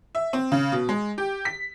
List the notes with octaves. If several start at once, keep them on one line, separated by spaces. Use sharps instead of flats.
E5
C4
C#3
B2
G#3
G4
B6